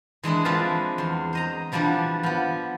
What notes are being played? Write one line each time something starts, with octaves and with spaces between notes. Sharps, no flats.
E3 G#3 D4 E4
F3 G#3 C4 B4 F5 A5
E2 C6
C5 D#5 A#5
E3 F3 G3 B3 D4
F3 B3